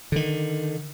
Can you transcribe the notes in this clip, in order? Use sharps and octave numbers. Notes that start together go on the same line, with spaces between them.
D3 D#3